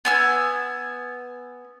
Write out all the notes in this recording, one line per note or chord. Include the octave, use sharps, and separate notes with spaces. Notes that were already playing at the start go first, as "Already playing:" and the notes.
B3 G#5 E6